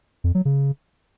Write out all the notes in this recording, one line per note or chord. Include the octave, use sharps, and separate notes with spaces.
F2
F#3
C#3